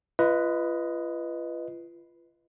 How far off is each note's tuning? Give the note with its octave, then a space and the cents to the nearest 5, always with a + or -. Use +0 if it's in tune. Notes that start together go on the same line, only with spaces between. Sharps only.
F4 -35 B4 +0 D#5 +0